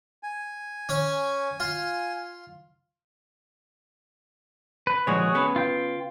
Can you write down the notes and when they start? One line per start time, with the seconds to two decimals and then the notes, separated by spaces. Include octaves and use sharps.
0.23 G#5
0.89 C#4 C#5
1.60 F4
4.87 B4
5.07 A#2 F3 G#3 F#4 G#4 C#5
5.34 C#3 B3 B4
5.56 F4 G5